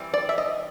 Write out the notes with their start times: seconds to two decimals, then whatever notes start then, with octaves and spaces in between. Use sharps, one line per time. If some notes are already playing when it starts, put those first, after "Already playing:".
Already playing: E3 G3 C4
0.14 D5
0.29 E5
0.38 D#5